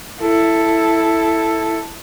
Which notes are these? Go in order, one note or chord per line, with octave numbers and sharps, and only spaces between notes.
E4 A4